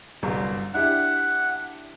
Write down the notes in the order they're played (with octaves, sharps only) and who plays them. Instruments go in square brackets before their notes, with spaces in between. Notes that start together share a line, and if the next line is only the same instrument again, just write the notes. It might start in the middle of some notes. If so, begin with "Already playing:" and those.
[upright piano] G1 C2 F#2
[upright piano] D4 E4 G4 [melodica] F#5